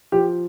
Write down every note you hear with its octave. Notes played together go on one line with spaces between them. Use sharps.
F3 G4